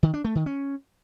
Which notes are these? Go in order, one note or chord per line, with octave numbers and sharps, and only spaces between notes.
D#3
D4
A3
D#3
C#4